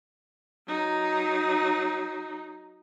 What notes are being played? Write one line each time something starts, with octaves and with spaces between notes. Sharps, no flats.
F#3 D#4